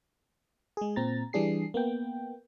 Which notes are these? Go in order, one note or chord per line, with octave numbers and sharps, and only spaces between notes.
G#3 G#4
A#2 C4 A#5 A6
E3 G3 D4 G#4 C7
A#3 B3 G5